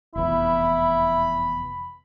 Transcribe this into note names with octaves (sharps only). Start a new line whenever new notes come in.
F1 E2 E4 B5